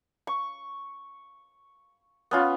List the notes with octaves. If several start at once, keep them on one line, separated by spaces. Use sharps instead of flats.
C#6
B3 C#4 F4